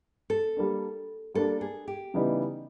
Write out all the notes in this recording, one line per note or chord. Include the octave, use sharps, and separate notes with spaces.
A4
G3 A#3 D4
G3 A#3 D4 A4
G#4
G4
C#3 E3 G3 B3 D#4